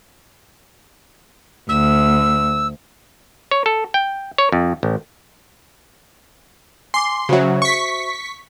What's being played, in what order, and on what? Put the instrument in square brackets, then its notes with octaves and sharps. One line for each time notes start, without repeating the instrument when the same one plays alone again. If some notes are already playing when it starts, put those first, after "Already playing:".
[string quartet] D2 [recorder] E6
[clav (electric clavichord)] C#5
A4
G5
C#5
F2
A1
[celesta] G#5 D6 [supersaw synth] C6
[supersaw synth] C#3 F#3 [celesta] F#4 C5 E5
[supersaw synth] C#6 B6